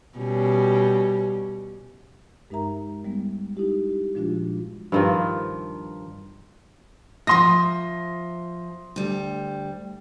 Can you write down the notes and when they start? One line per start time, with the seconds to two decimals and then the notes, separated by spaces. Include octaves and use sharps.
0.18 B2 G3 C#4
2.50 G2 G#3 D#4 A#4 E5 A#5
3.04 G3 G#3 B3
3.57 D#4 E4 G4
3.91 G4
4.14 A#2 F3 G#3 D4 F4 F#4
4.92 G2 D#3 F3
7.27 F3 E5 C6 D#6 A#6
8.96 D2 G3